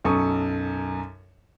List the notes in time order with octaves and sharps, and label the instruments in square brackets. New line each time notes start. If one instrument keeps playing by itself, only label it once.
[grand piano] B1 F#2 A4 C#6 D#6